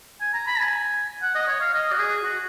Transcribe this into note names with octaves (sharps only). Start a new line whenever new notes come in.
G#5
A#5
B5
G#5
F#5
D#5
C#5
F5
D#5
F#4
G#4
F#4